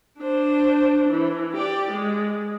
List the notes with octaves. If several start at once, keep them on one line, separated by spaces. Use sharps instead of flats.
D4 C5
E3
G4 D5
G#3